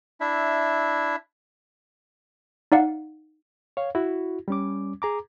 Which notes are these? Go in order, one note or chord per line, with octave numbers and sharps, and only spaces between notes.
D4 E4 E5
D#4 D5 F5 F#5
C#5 F5
E4 F#4
G3 C#4 D6
G#4 A#5 D6